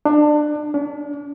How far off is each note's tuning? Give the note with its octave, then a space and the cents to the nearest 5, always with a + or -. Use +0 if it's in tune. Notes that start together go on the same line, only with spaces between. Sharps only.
D4 +25
D4 -40